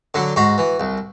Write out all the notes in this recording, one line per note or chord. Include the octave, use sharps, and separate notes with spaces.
D3 F#3
G#2 F#4
E3
C2